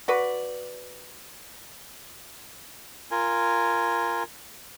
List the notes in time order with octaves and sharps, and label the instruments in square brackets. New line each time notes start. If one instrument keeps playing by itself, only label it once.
[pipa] F#4 B4 D5
[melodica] F4 A#4 G#5